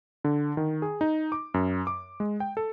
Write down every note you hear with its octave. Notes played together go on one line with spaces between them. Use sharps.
D3
D#3
G#4
D#4
D6
F#2
D6
G#3
G5
A4